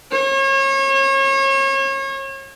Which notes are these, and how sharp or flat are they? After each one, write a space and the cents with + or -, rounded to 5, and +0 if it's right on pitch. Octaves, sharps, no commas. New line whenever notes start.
C#5 -35